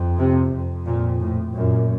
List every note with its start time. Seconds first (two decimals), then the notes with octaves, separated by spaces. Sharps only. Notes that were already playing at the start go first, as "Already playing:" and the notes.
Already playing: F2
0.18 C3
0.52 F2
0.86 A#2
1.20 A2
1.54 F#2 A#2